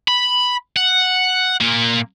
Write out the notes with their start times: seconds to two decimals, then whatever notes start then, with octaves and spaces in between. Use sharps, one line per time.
0.08 B5
0.77 F#5
1.61 A#2 A#3